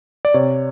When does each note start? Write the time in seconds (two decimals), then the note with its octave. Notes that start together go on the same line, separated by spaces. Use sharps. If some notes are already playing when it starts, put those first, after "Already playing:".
0.25 D5
0.34 C3 C#5